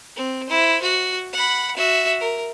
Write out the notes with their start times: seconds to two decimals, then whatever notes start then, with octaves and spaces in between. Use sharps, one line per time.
0.16 C4
0.47 E4 C5
0.82 F#4
1.33 F#5 B5
1.77 F#4 E5
2.20 A#4